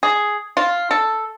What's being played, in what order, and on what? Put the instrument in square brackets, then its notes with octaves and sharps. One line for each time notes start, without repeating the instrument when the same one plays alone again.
[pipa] G#4
F4
A4